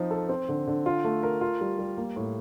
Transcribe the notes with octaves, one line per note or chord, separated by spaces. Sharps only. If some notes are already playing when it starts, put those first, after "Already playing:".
Already playing: F3 C4 D#4
A4
C4
D3
D3
F4
A3
A#4
F4
G3
G3
A#3
A2